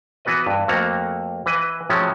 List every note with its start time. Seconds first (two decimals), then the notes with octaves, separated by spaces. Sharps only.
0.25 E3 B3 F#4 B4 D#5
0.47 G2
0.68 F2 A3 A#3 F#4 A#5
1.46 E3 B4 D#5
1.89 A2 F3 F#3 G#3 A3 C#4